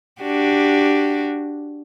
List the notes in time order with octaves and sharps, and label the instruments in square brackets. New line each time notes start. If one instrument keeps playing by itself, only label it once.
[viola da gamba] D4 F#4 G4